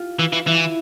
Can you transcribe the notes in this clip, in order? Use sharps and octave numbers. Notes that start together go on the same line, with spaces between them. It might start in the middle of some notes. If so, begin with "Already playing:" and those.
Already playing: F4 G4
E3
E3
E3 E4